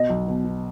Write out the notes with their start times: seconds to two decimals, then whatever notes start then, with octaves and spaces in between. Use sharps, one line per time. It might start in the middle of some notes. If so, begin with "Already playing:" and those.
Already playing: B2 D#5
0.10 B1
0.27 B2
0.45 B2